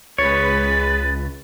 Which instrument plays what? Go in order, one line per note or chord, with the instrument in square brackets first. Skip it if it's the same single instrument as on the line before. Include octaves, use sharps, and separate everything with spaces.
[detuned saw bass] C#2 [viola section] G#3 B4 [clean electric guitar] C#5 [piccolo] A6